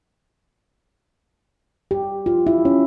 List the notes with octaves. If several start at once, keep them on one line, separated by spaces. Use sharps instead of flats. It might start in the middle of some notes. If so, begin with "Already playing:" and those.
G4
F4
E4
C#4